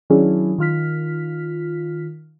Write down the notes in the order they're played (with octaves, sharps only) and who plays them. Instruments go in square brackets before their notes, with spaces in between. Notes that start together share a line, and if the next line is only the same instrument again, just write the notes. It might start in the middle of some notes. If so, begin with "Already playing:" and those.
[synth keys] D#3 F#3 C#4 D4 E4 G#4
D#3 F4 F6 B6